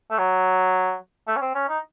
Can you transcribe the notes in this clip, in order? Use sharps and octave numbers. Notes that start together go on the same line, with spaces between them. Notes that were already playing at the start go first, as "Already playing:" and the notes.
A3
F#3
A3
C#4
C4
C#4
D#4